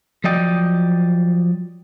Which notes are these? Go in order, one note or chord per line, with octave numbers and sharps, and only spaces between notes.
F3 F#3 D5 D#5 G5